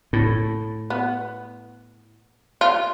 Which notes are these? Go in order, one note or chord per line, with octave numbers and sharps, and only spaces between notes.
A2
B3
F4